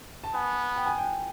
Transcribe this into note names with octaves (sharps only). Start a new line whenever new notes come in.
A5
B3 G#5
G5
G#5
G5